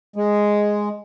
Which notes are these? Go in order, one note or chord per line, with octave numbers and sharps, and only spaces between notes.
G#3